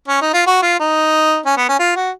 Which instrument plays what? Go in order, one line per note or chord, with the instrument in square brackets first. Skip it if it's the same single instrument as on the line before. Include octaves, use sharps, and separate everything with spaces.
[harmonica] C#4
D#4
F4
F#4
F4
D#4
C#4
B3
C#4
F4
F#4